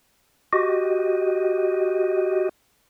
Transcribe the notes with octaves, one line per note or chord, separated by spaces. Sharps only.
F#4 G4 D#5